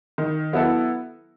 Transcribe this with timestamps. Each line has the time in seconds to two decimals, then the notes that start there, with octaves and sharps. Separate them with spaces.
0.18 D#3
0.53 F#3 B3 E4 A4